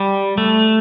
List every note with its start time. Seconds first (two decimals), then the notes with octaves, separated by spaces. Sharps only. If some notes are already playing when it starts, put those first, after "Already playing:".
Already playing: G3
0.38 A3